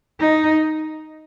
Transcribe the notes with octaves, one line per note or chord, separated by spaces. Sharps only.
D#4